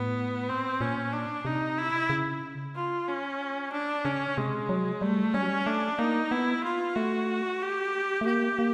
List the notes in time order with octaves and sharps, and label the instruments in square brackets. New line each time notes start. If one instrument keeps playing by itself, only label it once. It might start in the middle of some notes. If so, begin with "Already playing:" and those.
Already playing: [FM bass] A2 [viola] B3
[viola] C4
[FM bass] A#2 [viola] C#4
[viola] D4
[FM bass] C3 [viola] D#4
[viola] E4
[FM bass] C#3
[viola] F4
C#4
D4
[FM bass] C#3 [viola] C#4
[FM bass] C3 [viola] G#3
[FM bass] F#3
[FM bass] G3 [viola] A3
[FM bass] G3 [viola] C#4
[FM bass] F#3
G3
[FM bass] A3 [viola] D4
[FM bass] A#3 [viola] D#4
[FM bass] B3 [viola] E4
[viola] F4
[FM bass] A3 [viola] F#4
[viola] G4
[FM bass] A3
[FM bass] A#3 [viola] G4
[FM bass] A#3